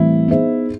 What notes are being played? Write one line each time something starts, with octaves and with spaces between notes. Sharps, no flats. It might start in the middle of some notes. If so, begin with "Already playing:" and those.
Already playing: A2 E3 G3 C4 E4
B3 D#4 G#4 C5 E5